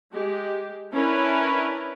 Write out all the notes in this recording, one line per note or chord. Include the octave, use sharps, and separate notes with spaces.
G#3 G4
C#4 D4 E4 A#4 B4